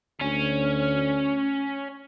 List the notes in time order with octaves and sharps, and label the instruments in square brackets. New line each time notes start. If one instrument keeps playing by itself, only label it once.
[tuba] D2 [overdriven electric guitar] C#4